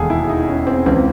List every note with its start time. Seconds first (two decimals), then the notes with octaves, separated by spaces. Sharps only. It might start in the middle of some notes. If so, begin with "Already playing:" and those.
Already playing: E1 D#2 G#4 A4
0.10 E4
0.29 D#4
0.48 C#4
0.67 C4
0.86 C#2 C#3 E3 C4